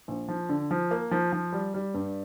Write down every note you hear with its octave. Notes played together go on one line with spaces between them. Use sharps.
A#1
F3
D3
F3
A#3
F3
F3
G3
G3
G2